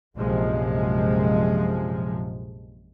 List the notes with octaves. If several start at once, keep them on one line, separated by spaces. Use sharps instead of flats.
A#1 F#2 C3 F3 G#3